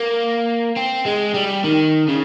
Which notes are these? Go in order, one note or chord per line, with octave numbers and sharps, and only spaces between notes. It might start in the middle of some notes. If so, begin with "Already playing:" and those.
Already playing: A#3
C4
G#3
G3
D#3
C#3